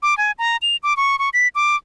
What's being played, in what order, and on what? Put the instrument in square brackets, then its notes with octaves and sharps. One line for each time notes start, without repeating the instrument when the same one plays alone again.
[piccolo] D6
G#5
A#5
F7
D6
C#6
C#6
B6
D6